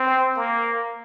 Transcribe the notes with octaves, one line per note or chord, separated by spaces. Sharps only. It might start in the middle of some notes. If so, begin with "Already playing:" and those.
Already playing: C4
A#3